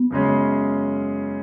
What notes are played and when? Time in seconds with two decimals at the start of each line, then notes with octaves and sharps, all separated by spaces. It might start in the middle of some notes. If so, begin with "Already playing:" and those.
Already playing: B3
0.10 F#2 C#3 G#3 C#4